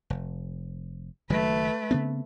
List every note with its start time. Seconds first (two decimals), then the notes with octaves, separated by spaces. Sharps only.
0.10 F1
1.30 F#1 D#3 F#3 A3 B4
1.91 C#3 B3 C4